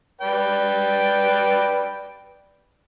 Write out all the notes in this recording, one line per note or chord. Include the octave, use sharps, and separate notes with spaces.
B4 D5 G5